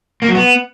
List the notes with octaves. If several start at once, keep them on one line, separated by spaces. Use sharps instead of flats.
A#3
F#3
B3